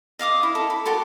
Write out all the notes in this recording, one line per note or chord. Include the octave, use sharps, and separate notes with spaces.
D#5 F5 D6 D#6
E4
A4
B5
F#4 G4 A4 C6